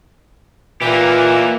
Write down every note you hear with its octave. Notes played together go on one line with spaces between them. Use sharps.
A#2 E3 A#3 G4